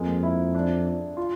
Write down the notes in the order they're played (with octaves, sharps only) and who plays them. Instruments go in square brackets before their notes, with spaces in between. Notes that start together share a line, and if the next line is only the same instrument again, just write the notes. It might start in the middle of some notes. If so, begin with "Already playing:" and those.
Already playing: [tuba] F2 [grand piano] G#3 A#3
[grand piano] E4
D4
D4
F4